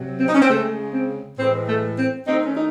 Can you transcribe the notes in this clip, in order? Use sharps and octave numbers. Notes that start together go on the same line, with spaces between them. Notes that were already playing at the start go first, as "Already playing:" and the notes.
Already playing: C3 F#3
C4
D#4
C#4
C4
C#3 G#3 A3
C4
A2 E3 G#3 C4
A3
C4
D#3 A3 C4 D#4
C#4
D#4